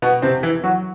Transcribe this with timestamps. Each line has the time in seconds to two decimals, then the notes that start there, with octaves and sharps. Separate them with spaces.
0.02 B2 B3
0.22 C3 C4
0.43 E3 E4
0.63 F#3 F#4